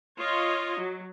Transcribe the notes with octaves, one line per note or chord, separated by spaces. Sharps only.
F4 C#5 D#5
F#3